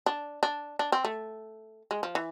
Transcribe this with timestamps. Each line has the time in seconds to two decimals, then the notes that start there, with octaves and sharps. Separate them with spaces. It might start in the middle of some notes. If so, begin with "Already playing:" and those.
0.06 D4
0.43 D4
0.79 D4
0.92 C4
1.05 A3
1.91 G#3
2.03 F3
2.15 E3